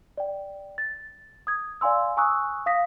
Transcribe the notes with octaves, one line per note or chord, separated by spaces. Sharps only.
D5 G5
A6
D#6 G#6
D5 F5 G#5 C6 E6
G#5 A#5 C#6 D#6 E6 F#6
F5 D#6 A#6 B6